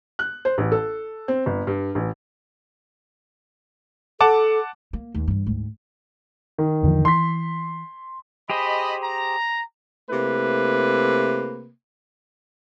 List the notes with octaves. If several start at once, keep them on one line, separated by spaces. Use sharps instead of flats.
F#6
C5
A1
A4
C4
G1
G2
A1
A4 F#5 A5 D6
A#3
D#2
G2 E3
D2 G#2
D#3
E2 D3 F3
E3 C6 B6
G4 G#4 C5 D#5 B5
A#5
C3 A3 A#3 E4 B4